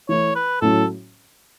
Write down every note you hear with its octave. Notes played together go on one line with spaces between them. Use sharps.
E3 A3 E4 C#5
B4
A2 F#3 C#4 F#4 A4